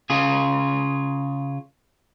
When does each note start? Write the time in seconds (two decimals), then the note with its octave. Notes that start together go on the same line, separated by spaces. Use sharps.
0.10 C#3 F4 G#4